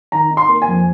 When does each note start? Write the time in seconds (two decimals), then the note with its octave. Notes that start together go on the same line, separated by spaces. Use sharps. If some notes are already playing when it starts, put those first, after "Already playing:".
0.12 D#3 A#5
0.30 D#4
0.37 C6
0.49 A#3
0.62 G#5
0.68 F2